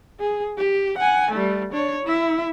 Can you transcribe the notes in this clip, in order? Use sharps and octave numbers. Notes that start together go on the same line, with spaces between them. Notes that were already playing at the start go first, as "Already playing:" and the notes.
G#4
G4
F#5 G#5
G3 A3
D4 C#5
E4 E5